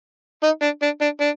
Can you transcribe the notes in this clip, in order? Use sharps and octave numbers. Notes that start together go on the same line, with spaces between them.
D#4
D4
D4
D4
D4